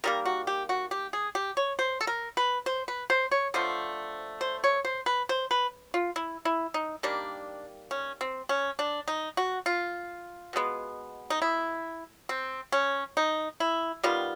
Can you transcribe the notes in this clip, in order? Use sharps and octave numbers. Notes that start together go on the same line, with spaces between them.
D#3 G3 A#3 A#4
F#4
G4
F#4
G4
G#4
G4
C#5
C5
A4
A#4
B4
C5
B4
C5
C#5
D3 F3 A3 C5
C5
C#5
C5
B4
C5
B4
F4
E4
E4
D#4
D#3 G3 A#3 D4
C#4
C4
C#4
D4
D#4
F#4
F4
B2 G#3 B3
D#4
E4
C4
C#4
D#4
E4
D#3 G3 B3 F4